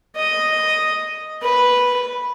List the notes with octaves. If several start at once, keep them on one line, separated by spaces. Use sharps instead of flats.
D#5
B4